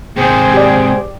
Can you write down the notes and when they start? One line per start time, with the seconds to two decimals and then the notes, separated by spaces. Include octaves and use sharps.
0.16 G#2 C3 G#4 C5 G5
0.54 G4 D5